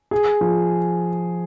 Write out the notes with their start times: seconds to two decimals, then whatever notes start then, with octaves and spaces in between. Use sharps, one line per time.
0.11 G#4
0.41 F3